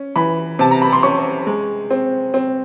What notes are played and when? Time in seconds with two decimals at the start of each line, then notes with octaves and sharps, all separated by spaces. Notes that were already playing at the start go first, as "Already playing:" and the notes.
Already playing: C#4
0.16 E3 B5
0.59 C3 A5
0.71 A#5
0.82 B5
0.93 C6
1.03 C#4 C#6
1.47 G#3
1.91 C4
2.34 C4